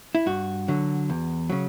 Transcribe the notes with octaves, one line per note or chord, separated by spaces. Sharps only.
E4
G2 F#4
D3 F#3
E2
C#3 F#3